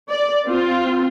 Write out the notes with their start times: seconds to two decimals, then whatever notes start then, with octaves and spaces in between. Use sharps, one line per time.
0.10 D5
0.47 C4 F4